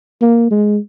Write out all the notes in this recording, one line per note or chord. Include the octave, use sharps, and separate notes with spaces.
A#3
G#3